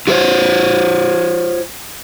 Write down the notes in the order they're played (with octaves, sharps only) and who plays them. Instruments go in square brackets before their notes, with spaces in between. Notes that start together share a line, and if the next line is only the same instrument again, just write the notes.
[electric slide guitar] F4 F#4 A#4 C5 C#5